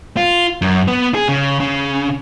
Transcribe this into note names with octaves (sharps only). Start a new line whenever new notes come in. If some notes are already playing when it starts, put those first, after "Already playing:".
F4
F#2
B3
G#4
C#3
C#3